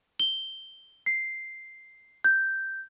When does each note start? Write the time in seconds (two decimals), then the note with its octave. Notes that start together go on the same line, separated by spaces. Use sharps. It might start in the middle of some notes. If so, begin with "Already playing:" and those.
0.20 G7
1.06 C7
2.24 G6